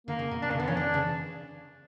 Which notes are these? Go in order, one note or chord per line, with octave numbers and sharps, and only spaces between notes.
D3 A#3
C#3
B2
B2 D4
C#3 A#3
D3 B3
E3 C#4
D3 D4
C#3